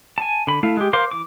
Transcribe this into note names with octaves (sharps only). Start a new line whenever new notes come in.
G#5 A5
D3 B5
A3 E4 F5
G#3 G4
A#4 C5 F5 C6 D6
E3 D6